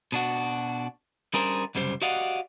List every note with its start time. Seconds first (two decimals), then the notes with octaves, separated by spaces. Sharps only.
0.12 B2 D4 F#4
1.34 G3 C#4 D4 G#4 A#4 C5
1.75 C2 F#2 C#3 G3 C5
2.02 F#4 G4 D5 D#5 F5 F#5